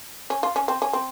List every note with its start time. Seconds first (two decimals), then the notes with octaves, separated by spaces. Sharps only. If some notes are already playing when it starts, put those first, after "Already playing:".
0.30 C#4
0.43 F4
0.56 C#4
0.68 C4
0.82 C#4
0.93 C4